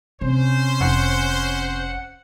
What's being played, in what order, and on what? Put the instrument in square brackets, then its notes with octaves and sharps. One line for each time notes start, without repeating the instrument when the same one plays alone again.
[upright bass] C3 [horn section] C#4 C5
[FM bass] F1 [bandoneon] F#5